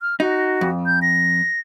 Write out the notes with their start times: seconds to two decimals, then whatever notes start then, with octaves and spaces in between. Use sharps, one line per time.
0.02 F6
0.20 D#4 F#4
0.61 F2
0.86 G6
1.02 A#6